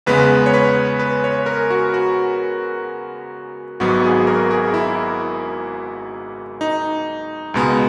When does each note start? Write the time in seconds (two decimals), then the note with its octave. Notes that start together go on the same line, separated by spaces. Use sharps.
0.06 E2 C#3 G#3 B3 B4
0.46 C#5
0.54 B4
0.99 B4
1.24 C#5
1.46 A#4
1.70 F#4
1.94 F#4
3.80 G#1 G#2 F#3 B3 F#4
4.04 G#4
4.27 A#4
4.51 G#4
4.74 E4
6.61 D#4
7.54 C#2 B2 G#3 B3